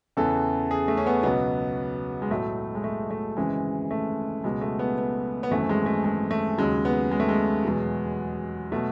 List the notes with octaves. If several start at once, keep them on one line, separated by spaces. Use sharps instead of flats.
E2 C#3 E3 A4
G#4
A3
C#4
B3
C#2 B2 F#3 B3
G#3
B1 A2 F#3 A3
G#3
A3
A3
G#1 F#2 C#3 E3 G#3
A3
C#2 B2 F#3 G#3
A3
B3
B3
B3
G#1 F#2 E3 A3
G#3
A3
G#3
A3
D#2 C#3 F#3 G#3
B3
G#3
A3
G#3
E2 B2 F#3
B2 F#3 A3